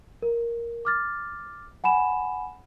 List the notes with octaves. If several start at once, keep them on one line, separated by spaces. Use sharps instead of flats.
A#4
D6 F6 A6
F#5 G#5 B5 E7